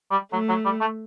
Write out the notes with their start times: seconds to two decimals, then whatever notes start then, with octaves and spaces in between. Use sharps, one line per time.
0.11 G3
0.32 F#3 A3
0.49 F#3
0.65 G3
0.81 A3